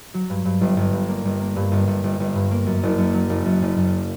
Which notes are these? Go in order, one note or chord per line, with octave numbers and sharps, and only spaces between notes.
F#3
G2
G2
G1
G1
G2
A#3
G1
A#3
G2
G1
G1
G1
G1
G2
A#3
F#2
F#1
F#2
F#3
F#1
F#2
F#1
F#2